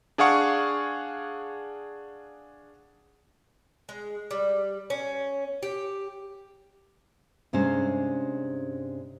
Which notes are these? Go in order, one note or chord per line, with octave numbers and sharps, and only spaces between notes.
D4 G#4 F5 F#5 C#6
G#3
G3
C#4
G4
G2 C3 G#3 C#4 C5